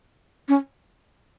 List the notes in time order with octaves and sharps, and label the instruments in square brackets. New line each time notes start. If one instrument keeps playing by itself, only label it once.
[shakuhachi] C#4